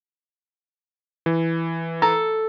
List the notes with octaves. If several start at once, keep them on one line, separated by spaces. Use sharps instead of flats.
E3
A4 A#5